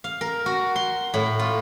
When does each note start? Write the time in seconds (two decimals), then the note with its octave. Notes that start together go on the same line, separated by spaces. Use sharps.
0.04 F5
0.21 A#4
0.46 F#4
0.76 C6
1.14 A2
1.39 F4